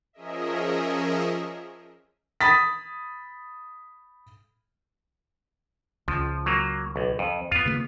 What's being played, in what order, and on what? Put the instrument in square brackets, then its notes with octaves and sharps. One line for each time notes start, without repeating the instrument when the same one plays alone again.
[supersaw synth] F3 C#4 G#4 A#4 D#5 E5
[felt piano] B5 D#6 A6 B6
[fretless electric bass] C#2 [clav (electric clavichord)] F3
[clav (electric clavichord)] F#3 A#3
B1
F2
[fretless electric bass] F2 [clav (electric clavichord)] B3 F4
[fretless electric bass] C#3 A#3